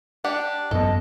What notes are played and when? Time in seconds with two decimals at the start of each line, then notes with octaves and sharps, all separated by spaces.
0.25 D4 G4 F#5
0.71 A1 F#2 B3 A4 D#5